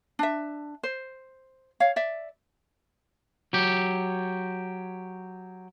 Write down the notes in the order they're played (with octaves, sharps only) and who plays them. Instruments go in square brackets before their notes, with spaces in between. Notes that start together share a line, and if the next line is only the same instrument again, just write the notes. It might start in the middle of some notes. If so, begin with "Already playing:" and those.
[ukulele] D4 E5
C5
C#5 F5
D5 E5
[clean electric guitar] F#3 G4